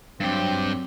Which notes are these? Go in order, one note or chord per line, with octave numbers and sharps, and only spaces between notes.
G2 F#3 C4 G4